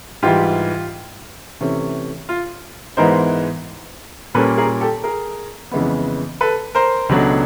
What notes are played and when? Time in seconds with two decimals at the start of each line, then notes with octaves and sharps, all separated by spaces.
0.23 G#2 E3 G3 F4 G4
1.61 C3 E3 A3 C#4
2.29 F4
2.97 G#2 E3 G#3 B3 D#4 A#4 C5
4.34 A#2 G3 A#3 C#4 A4 B4
4.57 G#4 A#4
4.81 G4 A4
5.03 G#4 A#4
5.71 F2 C#3 E3 G#3 B3
6.41 A4 B4
6.75 A#4 C5
7.09 C#2 B2 F#3 A3 D4